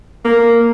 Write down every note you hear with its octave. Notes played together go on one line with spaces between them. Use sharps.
A#3